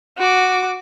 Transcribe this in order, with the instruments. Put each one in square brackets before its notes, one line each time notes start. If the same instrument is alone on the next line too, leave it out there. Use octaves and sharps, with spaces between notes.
[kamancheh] F#4 D6